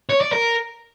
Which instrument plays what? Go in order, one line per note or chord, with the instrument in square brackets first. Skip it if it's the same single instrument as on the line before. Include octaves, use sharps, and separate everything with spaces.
[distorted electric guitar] C#5
D5
A#4